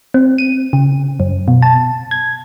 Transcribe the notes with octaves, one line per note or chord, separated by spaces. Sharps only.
C4
D#7
C#3
F#2
B2
A5
G#6